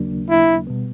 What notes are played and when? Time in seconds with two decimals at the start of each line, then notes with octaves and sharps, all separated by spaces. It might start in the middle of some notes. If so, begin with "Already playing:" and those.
Already playing: D#2 C#3 F#3 A#3 D4
0.30 E4
0.67 B2 G3 B3